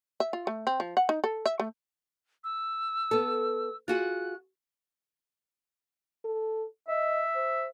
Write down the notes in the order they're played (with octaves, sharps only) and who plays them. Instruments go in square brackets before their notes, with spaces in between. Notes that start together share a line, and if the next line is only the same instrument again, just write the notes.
[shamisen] E5
F4
A3
C4
F3
F#5
D#4
A4
E5
A3
[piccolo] E6
[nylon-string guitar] B3 A4
[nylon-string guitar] F4 F#4 G#4 [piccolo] F#6
[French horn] A4
[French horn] D#5 [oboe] E5
[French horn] C5